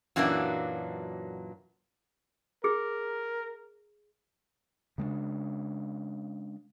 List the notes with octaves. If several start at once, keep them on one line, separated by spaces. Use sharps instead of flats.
F#2 A#2 E3 F#3 A#3 D4
G#4 A#4
C#3 G#3 A#3 D4